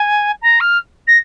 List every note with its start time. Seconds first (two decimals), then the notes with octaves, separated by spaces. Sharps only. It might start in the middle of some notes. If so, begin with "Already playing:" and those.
Already playing: G#5
0.41 A#5
0.60 F6
1.07 A#6